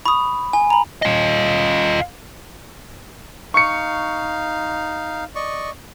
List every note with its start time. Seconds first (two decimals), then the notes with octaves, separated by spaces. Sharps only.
0.06 B5 C#6 D#6
0.53 G#5
0.70 A#5 B5
1.02 F4 D#5
3.54 D#4 F5 C#6 C#7
5.35 D5 D#5 C#6